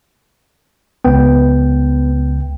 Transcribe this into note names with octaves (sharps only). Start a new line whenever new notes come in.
C#2 B3 G5